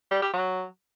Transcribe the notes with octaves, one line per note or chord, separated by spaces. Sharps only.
G3
G4
F#3